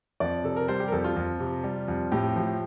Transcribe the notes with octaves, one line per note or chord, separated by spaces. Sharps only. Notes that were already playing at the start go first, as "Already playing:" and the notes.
F2 D5
C3 A4
A#4
G3 C5
G4
A#4
F2 A4
F4
F2
C3
G3
F2
A2 G4
F3